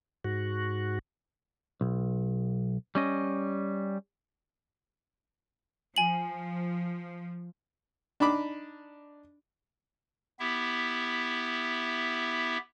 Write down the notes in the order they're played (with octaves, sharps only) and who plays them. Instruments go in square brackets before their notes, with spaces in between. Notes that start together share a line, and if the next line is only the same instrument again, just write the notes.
[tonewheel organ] G#2 F#4
[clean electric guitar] B1
G3 C#4 D#5
[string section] F3 [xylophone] G#5 F#7
[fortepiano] D4 D#4 B5 D6
[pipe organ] B3 E4 G4 E5